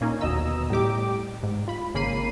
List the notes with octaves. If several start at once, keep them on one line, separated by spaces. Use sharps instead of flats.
A#2 A#3 C#4 D#4
G1 D#2 B2 D#5 A#5 E6
A2 G3 G4 D6
G#2
F4 B5
G#1 C#3 A#3 B5 C7 D#7